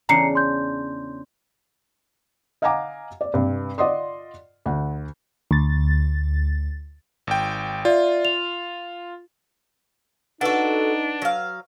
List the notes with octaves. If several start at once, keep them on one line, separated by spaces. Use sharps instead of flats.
E2 C#3 D4 A#5 C7 C#7
C6 G6
D#5 F5 F#5 G#5 A#5 D6
D5
G2 C3
F4 D5 D#5 F#5 C6 D#6
D2 F#5
D2 A6
G#1 G5
F4 D5 E5
F7
D4 D#4 F#4 A4 B4 F#5
F#3 F5